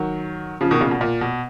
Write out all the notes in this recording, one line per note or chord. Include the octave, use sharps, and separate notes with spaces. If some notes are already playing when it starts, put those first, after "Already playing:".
Already playing: D#3 F#3
C#3 F3
B2 D#3
A#2 C#3
B2
A#2
B2